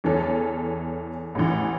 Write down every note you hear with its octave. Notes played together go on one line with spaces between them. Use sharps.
E2 E3 C#4 A4
A1 A2 E3